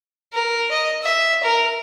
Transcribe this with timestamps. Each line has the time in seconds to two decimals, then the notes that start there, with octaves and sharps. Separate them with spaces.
0.33 A#4
0.71 D#5
1.03 E5
1.43 A#4